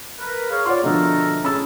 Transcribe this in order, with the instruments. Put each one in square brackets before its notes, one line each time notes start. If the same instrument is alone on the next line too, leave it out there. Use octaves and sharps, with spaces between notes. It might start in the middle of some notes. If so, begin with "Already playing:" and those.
[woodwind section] A#4 B4
G#4 C#5 F5
[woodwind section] F4 D5 [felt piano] C#5 F#5 C6
[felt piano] B2 D3 F3 [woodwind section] A3 A4 A#4
[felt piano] C#4 B5 E6 [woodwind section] E4 G#4 A5